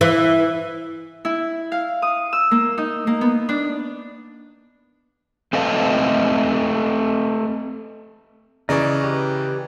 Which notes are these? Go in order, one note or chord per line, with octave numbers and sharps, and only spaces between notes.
E3
E4
F5
D#6
E6
A#3
D#4
A#3
B3
D4
A3 C4 A4 B4 D#5 F5
C#3 E3 D5 D#5 A#5 C#6
G4 B4